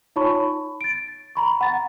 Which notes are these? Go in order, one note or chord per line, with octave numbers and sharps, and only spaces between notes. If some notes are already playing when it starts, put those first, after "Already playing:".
D#4 F4 C#5 A5 B5 C#6
B5
A6 D7
A#5 B5 C#6
F#5 A6